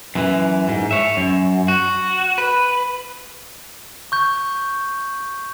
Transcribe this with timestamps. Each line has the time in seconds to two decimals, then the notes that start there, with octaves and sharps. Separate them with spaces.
0.15 F#2 E3
0.69 G#2
0.91 C#5 E5
1.17 F#2
1.68 F#4
2.38 B4
4.12 C#6 G6